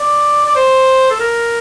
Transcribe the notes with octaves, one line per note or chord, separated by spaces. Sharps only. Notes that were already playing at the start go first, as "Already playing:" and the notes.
Already playing: D5
D5
C5
A4
A#4